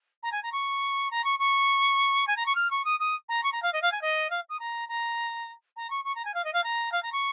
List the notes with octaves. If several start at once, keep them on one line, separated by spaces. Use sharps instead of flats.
A#5
G#5
A#5
C#6
A#5
C#6
C#6
G#5
A#5
C#6
F6
C#6
D#6
D#6
A#5
C#6
A#5
F5
D#5
F5
G#5
D#5
F5
D#6
A#5
A#5
A#5
C#6
C#6
A#5
G#5
F5
D#5
F5
A#5
F5
A#5
C#6